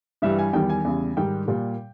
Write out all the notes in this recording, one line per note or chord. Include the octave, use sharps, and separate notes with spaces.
G2 E3 G3 E5
G#5
E2 D#3 G3 G5
G#5
E2 C#3 G3
G#2 D#3 G3 G5
A#2 G3